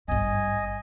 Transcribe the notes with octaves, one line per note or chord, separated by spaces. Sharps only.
G#1 G2 D#5 G#5